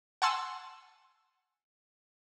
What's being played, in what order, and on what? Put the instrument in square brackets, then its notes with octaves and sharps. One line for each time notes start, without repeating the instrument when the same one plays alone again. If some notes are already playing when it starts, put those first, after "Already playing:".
[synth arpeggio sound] F#5 G#5 A5 C6 E6